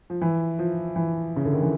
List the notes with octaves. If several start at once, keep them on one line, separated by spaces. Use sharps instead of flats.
F3
E3
F3
E3
C#3
D3
D#3
E3